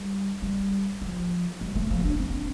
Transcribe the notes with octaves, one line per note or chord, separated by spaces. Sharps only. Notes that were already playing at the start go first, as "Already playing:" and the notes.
Already playing: G3
G3
F3
G3
A3
F3
D4
C4